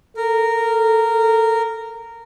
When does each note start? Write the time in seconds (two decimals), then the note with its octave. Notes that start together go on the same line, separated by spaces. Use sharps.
0.17 A4 A#4